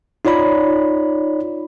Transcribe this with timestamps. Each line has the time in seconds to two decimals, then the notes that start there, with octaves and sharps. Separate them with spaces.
0.25 D#4 F4 C#5 D5 B5